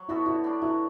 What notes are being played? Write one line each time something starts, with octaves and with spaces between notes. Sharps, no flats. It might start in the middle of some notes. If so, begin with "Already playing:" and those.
Already playing: F#3
B3 E4 F#4 A4
D3 E4
B3 D4
F#3 E4